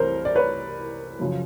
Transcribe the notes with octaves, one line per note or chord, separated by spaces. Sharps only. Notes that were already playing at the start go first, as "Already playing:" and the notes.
Already playing: C2 C3 E3 A3 A#4 C5 C#5
D5
B4 C#5
F#2 C#3 F3